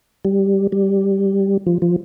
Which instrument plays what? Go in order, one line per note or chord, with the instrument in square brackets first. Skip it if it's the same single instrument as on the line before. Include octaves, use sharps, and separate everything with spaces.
[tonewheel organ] G3
G3
F3
F3